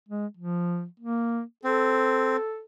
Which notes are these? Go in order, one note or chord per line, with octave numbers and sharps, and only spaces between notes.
G#3
F3
A#3
C4 A4